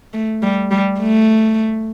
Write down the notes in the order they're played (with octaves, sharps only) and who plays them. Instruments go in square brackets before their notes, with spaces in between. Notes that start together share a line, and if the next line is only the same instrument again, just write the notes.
[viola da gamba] A3
G3
G3
A3